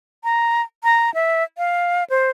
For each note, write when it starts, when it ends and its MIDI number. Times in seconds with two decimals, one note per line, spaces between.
0.24 0.62 82
0.84 1.13 82
1.14 1.43 76
1.58 2.04 77
2.10 2.30 72